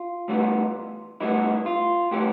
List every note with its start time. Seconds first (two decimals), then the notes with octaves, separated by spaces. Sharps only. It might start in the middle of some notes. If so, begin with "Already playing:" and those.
Already playing: F4
0.28 A2 E3 G3 B3
1.20 A2 E3 G3 B3 E4
1.66 F4
2.11 A2 E3 G3 B3 G4